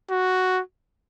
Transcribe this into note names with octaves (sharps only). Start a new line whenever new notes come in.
F#4